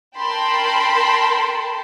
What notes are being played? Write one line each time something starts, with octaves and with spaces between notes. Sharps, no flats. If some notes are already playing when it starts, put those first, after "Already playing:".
A#4 G5 A5 B5 C6